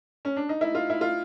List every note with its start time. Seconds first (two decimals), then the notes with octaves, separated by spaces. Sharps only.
0.25 C#4
0.36 D4
0.49 D#4
0.61 E4
0.75 F4
0.90 E4
1.01 F4